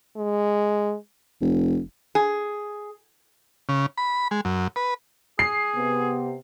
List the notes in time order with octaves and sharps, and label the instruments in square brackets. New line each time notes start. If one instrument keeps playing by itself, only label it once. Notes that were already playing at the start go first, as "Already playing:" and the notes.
[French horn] G#3
[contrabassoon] F1
[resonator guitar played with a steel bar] G#4
[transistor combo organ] C#3
B5
G#3
F#2
B4
[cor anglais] G#4 [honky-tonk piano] C7
[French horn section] C3 B3